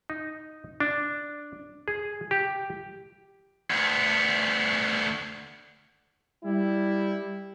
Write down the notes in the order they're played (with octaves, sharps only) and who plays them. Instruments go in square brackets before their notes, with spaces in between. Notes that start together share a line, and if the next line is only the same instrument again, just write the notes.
[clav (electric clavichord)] D#4
D4
G#4
G4
[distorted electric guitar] D2 B3
[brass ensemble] G3 E4